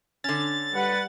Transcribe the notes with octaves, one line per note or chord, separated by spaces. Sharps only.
D3 C#4 A6
G3 B4 F#5